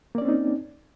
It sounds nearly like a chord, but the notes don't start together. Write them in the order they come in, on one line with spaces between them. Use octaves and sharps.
A#3 D5 C#4 C4 D#4